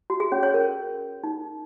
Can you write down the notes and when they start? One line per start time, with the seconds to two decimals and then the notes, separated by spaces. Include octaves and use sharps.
0.10 F#4
0.20 G#4
0.32 C#4 C#5
0.43 C#4 C#5
0.54 A#4
1.24 D#4